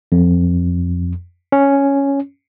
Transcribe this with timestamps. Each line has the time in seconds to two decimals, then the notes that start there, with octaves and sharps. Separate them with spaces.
0.12 F2
1.52 C#4